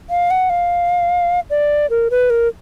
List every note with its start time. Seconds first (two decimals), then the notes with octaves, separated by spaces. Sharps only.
0.10 F5
0.31 F#5
0.50 F5
1.50 D5
1.90 A#4
2.11 B4
2.30 A#4